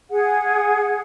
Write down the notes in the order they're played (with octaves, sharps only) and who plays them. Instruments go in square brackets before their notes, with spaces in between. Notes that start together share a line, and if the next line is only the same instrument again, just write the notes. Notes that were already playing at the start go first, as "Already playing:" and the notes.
[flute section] G#4 F#5